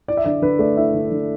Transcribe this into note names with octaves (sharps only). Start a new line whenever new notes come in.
E4 D5
E5
D3 D5
D3 B4
A3 D5
E4 E5
D3
D3